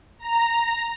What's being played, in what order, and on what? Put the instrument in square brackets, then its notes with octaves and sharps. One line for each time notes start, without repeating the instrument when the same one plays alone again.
[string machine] A#5